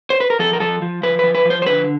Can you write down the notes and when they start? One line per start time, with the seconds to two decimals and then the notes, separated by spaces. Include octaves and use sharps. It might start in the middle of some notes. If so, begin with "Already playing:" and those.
0.10 C5
0.20 B4
0.30 A#4
0.39 F3 A4
0.53 A#4
0.60 F3 A4
0.82 F3
1.03 F3 B4
1.19 F3 B4
1.35 B4
1.45 F3
1.50 C5
1.62 C5
1.66 D3 B4